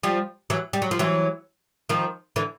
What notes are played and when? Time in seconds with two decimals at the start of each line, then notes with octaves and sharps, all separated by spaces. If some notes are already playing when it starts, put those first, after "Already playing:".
0.03 F3 G3
0.50 E3 F#3
0.73 G3
0.82 F#3
0.91 F3
0.99 E3 F#3
1.89 D#3 F3
2.36 D3 E3